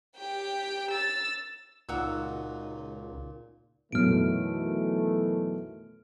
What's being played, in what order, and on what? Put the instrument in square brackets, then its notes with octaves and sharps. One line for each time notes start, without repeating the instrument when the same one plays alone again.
[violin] G4 G5
E6 A6
[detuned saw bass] C#2 [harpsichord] A#2 [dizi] D#4 [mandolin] F#4 A#5 E6
[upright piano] F#2 B2 [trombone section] D#3 E3 A3 [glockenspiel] F6 D7